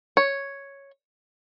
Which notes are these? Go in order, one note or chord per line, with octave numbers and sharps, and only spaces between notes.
C#5